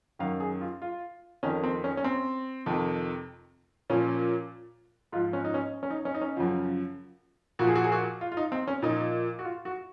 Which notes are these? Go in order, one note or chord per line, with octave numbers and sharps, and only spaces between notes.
F#2 D#3 F5
G#4
F4
F4
F2 D#3 C#4
C4
C#4
C#4
C4
F2 C3 D#3
A#2 F3 C#4
G#2 F3 F4
C#4
D#4
C#4
C#4
D#4
C#4
D#4
C#4
F#2 C#3 F3
A#2 F3 F#4
G#4
F#4
G#4
F#4
F4
F4
D#4
C4
C#4
A#2 F3 D#4
F#4
F4
F#4